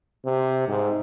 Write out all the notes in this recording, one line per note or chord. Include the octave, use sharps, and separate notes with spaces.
C3
G#2